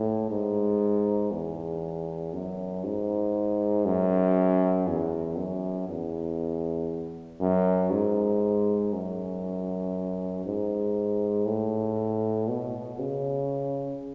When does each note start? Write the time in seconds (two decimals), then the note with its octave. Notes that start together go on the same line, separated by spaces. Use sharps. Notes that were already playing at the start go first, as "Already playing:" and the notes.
Already playing: A2
0.30 G#2
1.32 E2
2.33 F#2
2.84 G#2
3.86 F#2
4.87 E2
5.37 F#2
5.89 E2
7.41 F#2
7.92 G#2
8.93 F#2
10.45 G#2
11.46 A2
12.48 B2
12.99 C#3